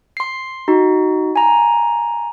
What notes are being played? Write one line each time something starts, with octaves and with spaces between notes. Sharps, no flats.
C6 C7
D#4 F#4
G#5 A#5